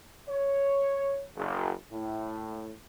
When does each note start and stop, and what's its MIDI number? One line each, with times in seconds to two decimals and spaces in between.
0.28 1.24 73
1.36 1.71 30
1.92 2.71 45